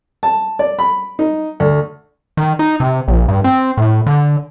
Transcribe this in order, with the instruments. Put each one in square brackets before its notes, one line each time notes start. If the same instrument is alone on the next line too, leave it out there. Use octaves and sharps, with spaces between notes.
[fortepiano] A5
D5
B5
D#4
D2
[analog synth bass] D#3
D#4
C3
A#1
G2
C4
A2
D3